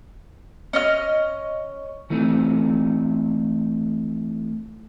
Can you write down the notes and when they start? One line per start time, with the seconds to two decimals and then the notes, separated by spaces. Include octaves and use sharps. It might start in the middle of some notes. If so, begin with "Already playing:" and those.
0.73 C#4 D#5 F6
2.10 E3 A3 C4 D#4